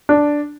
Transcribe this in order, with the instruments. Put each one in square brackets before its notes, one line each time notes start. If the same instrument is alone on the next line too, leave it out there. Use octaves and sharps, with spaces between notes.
[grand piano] D4